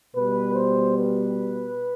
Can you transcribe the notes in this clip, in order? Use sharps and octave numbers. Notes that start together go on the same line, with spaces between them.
B2 G3 B4
C5
B4